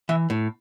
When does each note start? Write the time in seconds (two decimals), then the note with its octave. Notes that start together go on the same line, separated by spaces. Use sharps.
0.09 E3 E5
0.30 A2